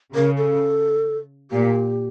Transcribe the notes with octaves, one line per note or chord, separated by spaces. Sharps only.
C#3 A#4
A4
A#2 G4